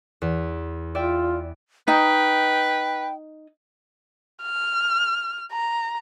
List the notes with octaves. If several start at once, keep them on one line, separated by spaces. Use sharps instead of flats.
E2
F4 D5 E5 G5
D#4 B4 G5
F6
A#5